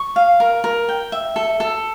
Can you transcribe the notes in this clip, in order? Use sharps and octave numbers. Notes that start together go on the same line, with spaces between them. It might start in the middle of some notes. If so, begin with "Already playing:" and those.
Already playing: C#6
F5
A#4
A#4
G5
E5
A4
A4